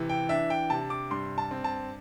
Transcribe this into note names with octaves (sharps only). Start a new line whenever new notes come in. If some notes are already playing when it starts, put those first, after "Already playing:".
Already playing: C3 E3
G5
D4 E5
G5
C3 A5
D6
G2 C6
A5
C4
A5